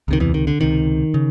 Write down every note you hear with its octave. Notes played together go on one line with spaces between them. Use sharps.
C#2 C3 D#3
E2 E3
D#3
D3
C#2 C3 D#3
C#3